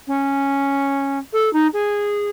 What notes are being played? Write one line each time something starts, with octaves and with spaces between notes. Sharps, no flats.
C#4
A4
D#4
G#4